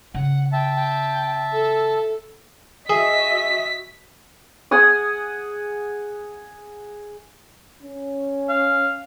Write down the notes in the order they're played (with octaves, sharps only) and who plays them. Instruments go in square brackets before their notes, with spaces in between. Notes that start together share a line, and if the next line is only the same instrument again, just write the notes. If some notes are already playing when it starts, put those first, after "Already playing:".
[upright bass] C#3 [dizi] F#5
[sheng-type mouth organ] E5 A5 [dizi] G5
[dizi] G5
A4
[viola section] F#4 D#5 E5 [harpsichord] G#4 [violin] B6
[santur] G#4 F#5 G#5 D#6
[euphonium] C#4
[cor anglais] F5